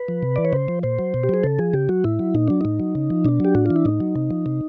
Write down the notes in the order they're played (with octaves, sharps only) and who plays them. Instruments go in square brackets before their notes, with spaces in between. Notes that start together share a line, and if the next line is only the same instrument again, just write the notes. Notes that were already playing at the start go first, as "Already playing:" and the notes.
Already playing: [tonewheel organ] B4
F3
C3
E3 D5
C#5
C#3 C5
F3
A#2 C5
F#3
B2
G4
F#3 G#4
C#3 A4
F3 G#4
C#3 G4
F#3 F#4
A2 E4
F#3
A#2 D#4
F#3 D4
A2 D#4
F#3
C#3
F3
B2 D4
F#3 G4
A2 F#4
E3 F4
E4
A2 D#4
F#3
C3
F3
C3